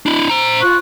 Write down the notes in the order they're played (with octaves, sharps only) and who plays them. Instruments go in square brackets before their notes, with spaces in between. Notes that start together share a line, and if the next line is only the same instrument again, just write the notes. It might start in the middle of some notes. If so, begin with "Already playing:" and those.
[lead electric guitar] D4 E4
C5 A#5
[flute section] F4 C#6 F#6